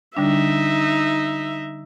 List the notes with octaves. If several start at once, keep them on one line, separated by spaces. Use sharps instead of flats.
D3 G3 D4 D#4 E5